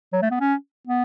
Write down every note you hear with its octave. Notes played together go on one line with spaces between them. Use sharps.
F#3
A3
B3
C#4
B3